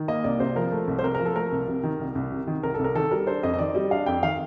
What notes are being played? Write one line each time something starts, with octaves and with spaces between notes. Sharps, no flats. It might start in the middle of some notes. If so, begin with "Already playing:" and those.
Already playing: D#3
A#3 D#5
C2 D5
C3 C5
F3 A#4
A3
C2
C5
C3 A#4
F3 A#4
A4
A3 A#4
C2
C3
D#3
C2
C2
C3
D#3
C2 A#4
A4
C2
A#4
D#3 A4
G3 A#4
D4 C5
F2 D#5
D#5
D#3 D5
G3 D#5
D4 F5
F2 G5
D#3 F5